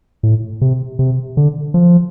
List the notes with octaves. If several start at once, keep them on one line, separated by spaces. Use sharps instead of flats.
A2
C3
C3
D3
F3